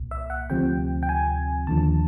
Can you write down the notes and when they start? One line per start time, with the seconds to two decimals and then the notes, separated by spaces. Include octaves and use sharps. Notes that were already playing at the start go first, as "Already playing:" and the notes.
Already playing: C2 A#2
0.11 E5
0.30 F#5
0.50 D2 C3 F3 G5
1.03 G5
1.09 G#5
1.67 D#2 D3 F3 A5